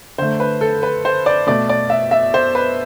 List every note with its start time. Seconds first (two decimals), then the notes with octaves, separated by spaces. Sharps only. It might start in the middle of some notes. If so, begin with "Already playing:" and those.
0.18 D3 A3 C5
0.40 B4
0.61 A4
0.83 B4
1.05 C5
1.26 D5
1.47 B2 A3 D5
1.69 D5
1.90 E5
2.11 E5
2.34 C5
2.55 B4